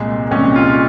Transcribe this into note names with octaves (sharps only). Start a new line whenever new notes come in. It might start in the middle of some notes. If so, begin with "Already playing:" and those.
Already playing: C2 A#2 G#3
C2 A#2 G#3 C#4
F4